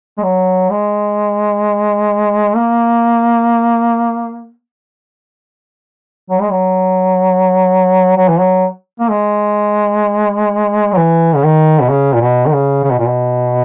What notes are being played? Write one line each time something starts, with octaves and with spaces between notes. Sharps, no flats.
G#3
F#3
G#3
A#3
F#3
G#3
F#3
F#3
E3
F#3
A#3
G#3
F#3
E3
C#3
D#3
B2
C#3
A#2
B2
D#3
C#3
C#3
B2
A#2
B2